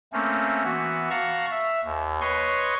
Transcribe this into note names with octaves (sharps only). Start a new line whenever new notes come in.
A3 A#3 C4 C#4
E3 B3 F#4
F5 F#5 A5 A#5 C#6 F6
E5
D#2
B4 C#5 D#5 C6 C#6